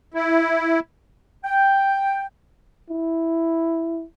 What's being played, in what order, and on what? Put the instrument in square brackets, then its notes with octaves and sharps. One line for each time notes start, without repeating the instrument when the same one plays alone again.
[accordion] E4
[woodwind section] G5
[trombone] E4